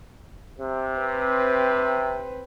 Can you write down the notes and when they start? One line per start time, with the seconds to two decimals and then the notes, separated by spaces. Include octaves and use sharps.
0.59 C3
1.01 C4 B4